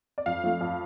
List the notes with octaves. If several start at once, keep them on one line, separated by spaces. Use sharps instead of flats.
D5
F2 F5
F3 A3
F2